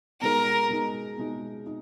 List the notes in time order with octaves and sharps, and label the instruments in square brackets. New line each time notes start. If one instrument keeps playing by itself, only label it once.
[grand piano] B2 G#3 D#4 [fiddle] A#4
[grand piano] B2 G#3 D#4
B2 G#3 D#4
D#4